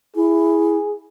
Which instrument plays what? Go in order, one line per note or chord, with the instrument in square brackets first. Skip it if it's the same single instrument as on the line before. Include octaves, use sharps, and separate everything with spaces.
[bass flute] E4 [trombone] G#4